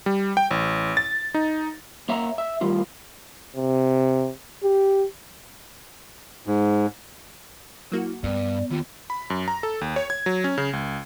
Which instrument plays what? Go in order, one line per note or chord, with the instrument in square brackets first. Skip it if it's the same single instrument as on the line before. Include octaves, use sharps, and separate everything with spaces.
[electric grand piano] G3
G5
A1
A6
D#4
[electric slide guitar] A#3 C#5 E5 F#5 A#5
E5
A2 D#3 G3 F4
[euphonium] C3
G4
[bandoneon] G#2
[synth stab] F#3 A#3 F#4 [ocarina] E4
[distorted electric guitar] G2 [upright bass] B3 [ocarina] D5
[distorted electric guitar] D#2 [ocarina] F4
[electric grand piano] B5
F#2
A#5
A4
D#2
C#5
G#6
F#3
C#4
C#3
C#2